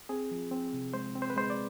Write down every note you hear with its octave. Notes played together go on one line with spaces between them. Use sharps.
C4 G#4
F3
C4
C3
G#3 C5
C4
C5
B4
G#3 C5
D5